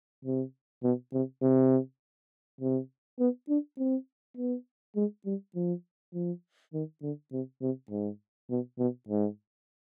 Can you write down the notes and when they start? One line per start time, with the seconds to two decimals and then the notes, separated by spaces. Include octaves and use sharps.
0.25 C3
0.83 B2
1.13 C3
1.42 C3
2.61 C3
3.19 B3
3.49 D4
3.78 C4
4.37 B3
4.96 G#3
5.26 G3
5.55 F3
6.14 F3
6.74 D#3
7.02 D3
7.32 C3
7.62 C3
7.91 G#2
8.50 B2
8.79 B2
9.09 G#2